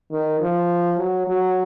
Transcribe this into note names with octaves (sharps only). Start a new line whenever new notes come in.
D#3
F3
F#3
F#3